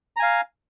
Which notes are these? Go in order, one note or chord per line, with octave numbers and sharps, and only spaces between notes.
F5 G#5 A#5